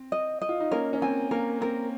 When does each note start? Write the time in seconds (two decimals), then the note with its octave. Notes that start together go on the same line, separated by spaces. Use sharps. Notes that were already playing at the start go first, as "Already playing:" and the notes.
Already playing: C4
0.12 D#5
0.42 D#5
0.49 F4
0.60 D#4
0.71 A#3 C#4 A#4
0.93 C#4
1.02 C4 G#5
1.31 A#3 A#4
1.61 C4 A#4